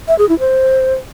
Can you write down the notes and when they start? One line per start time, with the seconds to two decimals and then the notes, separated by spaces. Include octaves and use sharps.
0.08 E5
0.19 G#4
0.29 E4
0.39 C5